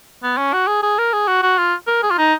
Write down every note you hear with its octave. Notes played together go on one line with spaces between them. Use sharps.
B3
C#4
F#4
G#4
G#4
A#4
G#4
F#4
F#4
F4
A#4
G#4
F4
D#4